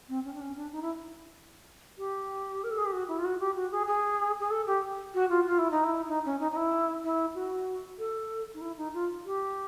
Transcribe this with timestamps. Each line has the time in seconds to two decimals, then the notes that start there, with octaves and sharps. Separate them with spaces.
0.09 C4
0.25 C#4
0.33 D4
0.41 C#4
0.56 D4
0.72 D#4
0.82 E4
1.98 G4
2.64 A#4
2.71 A4
2.78 G#4
2.86 G4
2.92 F#4
3.08 E4
3.19 F4
3.24 F#4
3.40 G4
3.56 F#4
3.71 G#4
3.88 G#4
4.40 G#4
4.51 A4
4.67 G4
5.14 F#4
5.29 F4
5.46 F4
5.59 E4
5.71 D#4
5.84 E4
6.08 D#4
6.25 C#4
6.40 D#4
6.52 D#4
6.56 E4
7.04 E4
7.35 F#4
7.98 A4
8.54 D#4
8.61 E4
8.77 D#4
8.94 F4
9.25 G4